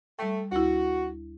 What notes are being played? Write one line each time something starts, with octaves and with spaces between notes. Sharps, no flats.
G3 A3 G5
D2 E4 F#4